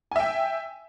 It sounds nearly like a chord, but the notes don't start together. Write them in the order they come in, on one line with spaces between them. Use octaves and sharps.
G#5 E5 G5